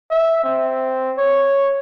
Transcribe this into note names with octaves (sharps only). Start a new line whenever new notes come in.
E5
C4
C#5